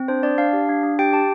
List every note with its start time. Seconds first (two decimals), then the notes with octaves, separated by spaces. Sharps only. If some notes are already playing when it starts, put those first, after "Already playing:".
Already playing: C4
0.08 D4 C5
0.23 D4 D5
0.38 D4 F5
0.53 G4
0.69 D4
0.84 D4
0.99 G4 G5
1.13 G4 A5